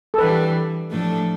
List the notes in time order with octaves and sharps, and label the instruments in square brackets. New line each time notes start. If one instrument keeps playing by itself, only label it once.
[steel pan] A4
[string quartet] E3 G3 D4 [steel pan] B4
[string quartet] A2 F3 A3 D4 A4